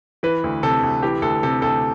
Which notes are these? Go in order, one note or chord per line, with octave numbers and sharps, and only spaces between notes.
E3 B4
D2
C3 A4
D2
E3 G4
D2 A4
C3 A4
D2 A4